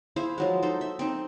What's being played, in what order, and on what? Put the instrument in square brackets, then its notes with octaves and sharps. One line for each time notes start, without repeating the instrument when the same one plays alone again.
[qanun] E4 G#4 C5 F5
F3 F#3 G#3
D#4 A4 C5
E5
C4 D#4